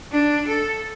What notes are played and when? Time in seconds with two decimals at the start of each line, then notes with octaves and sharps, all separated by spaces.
0.12 D4
0.48 A4